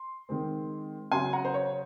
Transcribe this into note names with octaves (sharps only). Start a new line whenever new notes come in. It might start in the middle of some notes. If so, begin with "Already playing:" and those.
Already playing: C6
D#3 G#3 C4
C#3 F#3 C#4 G#5 C6
F#5 A#5
C5
C#5